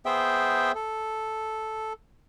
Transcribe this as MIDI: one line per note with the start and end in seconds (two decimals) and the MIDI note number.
0.06 0.72 59
0.06 0.72 68
0.06 0.72 72
0.06 0.72 76
0.06 0.72 79
0.75 1.93 69